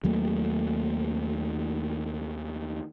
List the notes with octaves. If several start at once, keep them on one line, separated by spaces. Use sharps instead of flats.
D#2 F#3 A3 A#3